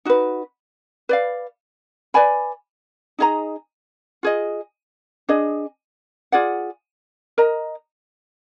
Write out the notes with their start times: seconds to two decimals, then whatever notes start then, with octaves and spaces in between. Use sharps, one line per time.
0.05 D#4 F#4 B4
1.09 B4 D5 F5
2.14 B4 D5 G#5 B5
3.19 D#4 G#4 D#5 A#5
4.23 F4 G#4 D#5
5.29 D4 G#4 D#5
6.32 F4 G#4 D5 F#5
7.38 A#4 D#5 A#5